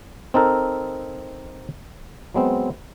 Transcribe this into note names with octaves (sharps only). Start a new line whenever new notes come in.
C4 D#4 A4 A#4
F#3 G#3 B3 C4